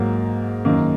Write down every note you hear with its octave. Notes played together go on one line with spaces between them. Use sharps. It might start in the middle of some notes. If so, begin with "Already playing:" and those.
Already playing: G#2 F#3 A#3
F#2 D#3 A#3